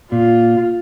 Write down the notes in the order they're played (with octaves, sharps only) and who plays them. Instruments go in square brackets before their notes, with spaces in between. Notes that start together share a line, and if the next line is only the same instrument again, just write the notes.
[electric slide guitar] A#2 [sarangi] F4